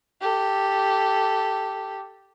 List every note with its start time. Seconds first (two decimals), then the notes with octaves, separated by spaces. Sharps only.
0.21 G4 A4